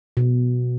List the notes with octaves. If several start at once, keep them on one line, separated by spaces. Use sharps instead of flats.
B2